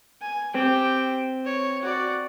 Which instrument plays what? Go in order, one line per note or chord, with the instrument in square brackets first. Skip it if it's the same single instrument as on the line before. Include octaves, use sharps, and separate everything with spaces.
[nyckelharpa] G#5
[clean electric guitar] C4 [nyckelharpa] G4 G5
[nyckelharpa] C#5
F#4 D5